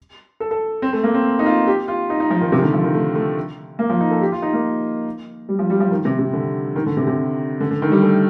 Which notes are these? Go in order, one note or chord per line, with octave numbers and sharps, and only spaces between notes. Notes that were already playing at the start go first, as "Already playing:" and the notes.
A4
A4
C4
A3
A#3
C4
D#4
F4
G4
F4
D#4
D#4
F3
D#3
C3
D#3
D3
F3
D#3
A3
A3
A#3
F3
D#4
A4
G4
F4
D#4
A#3
G3
F3
G3
F3
D#3
C3
C3
D3
D#3
D3
C3
C3
D3
D3
D#3
A3
G3
A3